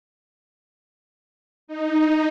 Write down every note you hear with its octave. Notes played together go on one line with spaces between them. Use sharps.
D#4